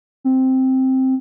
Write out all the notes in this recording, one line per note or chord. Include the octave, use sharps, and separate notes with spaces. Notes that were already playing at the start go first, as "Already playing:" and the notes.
C4